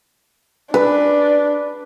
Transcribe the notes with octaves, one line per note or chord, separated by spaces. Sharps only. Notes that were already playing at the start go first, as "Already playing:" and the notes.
D4 B4